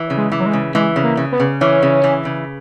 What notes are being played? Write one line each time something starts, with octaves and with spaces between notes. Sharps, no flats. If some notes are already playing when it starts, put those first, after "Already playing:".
Already playing: E3
C#3
G#3
E3
F#3
G#3
C#3
E3 G#3
C#3
A#3
C#3
B3
C#3
E3 C#4
C#3
E3
C#3